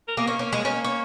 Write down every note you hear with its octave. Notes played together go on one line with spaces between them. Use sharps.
A#4
A#3 G#4
A#3 C#4
C#4
G#3
A#3 C#4
C#4